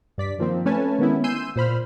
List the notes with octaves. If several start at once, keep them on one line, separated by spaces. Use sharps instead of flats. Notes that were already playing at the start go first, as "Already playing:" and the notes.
G2 D5 B6
D#3 F3 A#3 C4
A3 C#4 B4 C#5 G#5 A5
D#3 G#3 B3 C#4 E4
G#5 C6 E6 G6 C7 D#7
A#2 C5 B5 F6